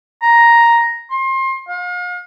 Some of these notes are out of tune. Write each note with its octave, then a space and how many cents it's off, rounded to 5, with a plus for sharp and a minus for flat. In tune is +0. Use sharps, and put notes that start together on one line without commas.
A#5 +5
C6 +30
F5 +40